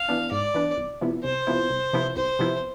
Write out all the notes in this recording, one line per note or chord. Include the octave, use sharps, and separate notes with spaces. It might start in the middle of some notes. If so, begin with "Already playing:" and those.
Already playing: F5
E3 B3 D4
G#2 D5
E3 B3 D4
C2
C3 F3 B3 E4
C2 C5
C3 F3 B3 E4
C2
C3 F3 B3 E4
C2 C5
C3 F3 B3 E4